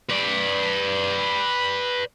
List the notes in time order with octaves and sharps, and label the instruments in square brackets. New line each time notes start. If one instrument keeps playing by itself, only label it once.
[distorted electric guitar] B4 D5